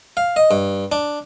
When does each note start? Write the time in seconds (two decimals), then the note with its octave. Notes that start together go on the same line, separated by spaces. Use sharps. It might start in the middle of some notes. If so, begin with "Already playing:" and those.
0.17 F5
0.36 D#5
0.51 G2
0.92 D4